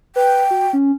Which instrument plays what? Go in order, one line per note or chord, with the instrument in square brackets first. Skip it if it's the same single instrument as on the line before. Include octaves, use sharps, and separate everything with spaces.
[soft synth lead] B4 [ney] G5
[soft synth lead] F#4
C#4